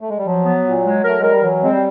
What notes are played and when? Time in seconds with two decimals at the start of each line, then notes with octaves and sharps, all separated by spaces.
0.01 A3
0.10 G#3
0.18 G3
0.26 F3 F#3
0.45 B3
0.64 A#2
0.85 G#3
1.04 A3 A#4
1.19 G#3 A#4
1.31 G3
1.42 E3 F#3
1.62 G#3 C4
1.72 G3